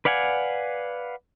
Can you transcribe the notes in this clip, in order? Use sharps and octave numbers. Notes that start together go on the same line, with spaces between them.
B4 D5 F5 F#5 G#5